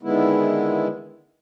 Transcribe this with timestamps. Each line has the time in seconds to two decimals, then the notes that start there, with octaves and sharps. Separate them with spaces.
0.02 D3 D#3 G#3 B3 E4